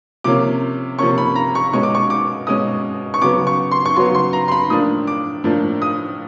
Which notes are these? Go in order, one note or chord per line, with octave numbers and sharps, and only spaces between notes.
C3 F3 A#3 C#4 D6
C3 F3 A#3 C#4 C#6
B5
A#5
C#6
B2 G#3 C#4 C#6
D6
C#6
D6
B2 G#3 C#4 D#6
C#6
C#3 F#3 B3 D6
C#6
C6
C#6
C#3 F#3 B3 C6
C6
A#5
C6
B5
A2 F3 A#3 D4 D#6
D6
A2 F3 A#3 D4
D#6